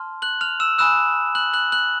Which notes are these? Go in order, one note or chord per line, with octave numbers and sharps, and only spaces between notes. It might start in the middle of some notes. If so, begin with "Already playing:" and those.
Already playing: A5 C6 F6
F#6 F#7
F6 F7
E6 E7
G#5 B5 D#6 E6 F#6 E7
F#6 F#7
F#6 F#7
F#6 F#7